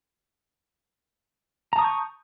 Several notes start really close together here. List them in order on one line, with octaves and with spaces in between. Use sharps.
A#5 A5 D#6 C#6 G6